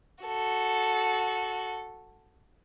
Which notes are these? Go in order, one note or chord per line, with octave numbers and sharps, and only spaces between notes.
F#4 A4